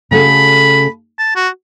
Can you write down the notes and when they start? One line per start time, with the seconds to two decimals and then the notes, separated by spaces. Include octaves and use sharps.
0.11 C#3 A3 F#4 A4 B5
1.19 A5
1.36 F#4